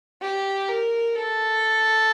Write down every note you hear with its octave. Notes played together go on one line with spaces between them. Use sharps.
G4
A#4
A4